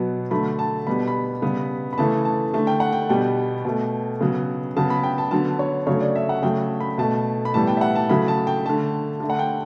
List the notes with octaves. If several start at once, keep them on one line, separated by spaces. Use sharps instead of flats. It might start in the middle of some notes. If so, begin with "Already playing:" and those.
Already playing: B2 F#3 B3
D3 F#3 A3 B5
A5
B2 G3 B3 B5
B5
C#3 G3 B3
B5
C#3 E3 A3 A5
A5
D3 A3 A5
G5
F#5
G5
B2 G3 B3 G5
B2 A3
C#3 F#3 B3
C#3 F#3 B3 A5
B5
G5
A5
D3 F#3 B3 A5
C#5
C#3 F#3 A3 C#5
D5
E5
F#5
C#3 F#3 A3 G5
B5
B2 A3 A5
B5
A2 E3 G3 B3 A5
G5
E5
F#5
A5
C#3 F#3 A3 B5
A5
G5
D3 A3 A5
D3 A3
F#5
G5